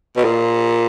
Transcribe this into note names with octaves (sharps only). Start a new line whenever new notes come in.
B2
A#2